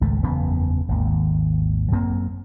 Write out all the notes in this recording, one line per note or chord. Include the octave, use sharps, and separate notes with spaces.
G#1 C#2 A3
F#1 E2 C#3 B3
G#1 D#2
F#2 A#3 C4